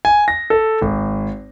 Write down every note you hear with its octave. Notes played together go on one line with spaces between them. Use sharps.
G#5
A#6
A4
G#1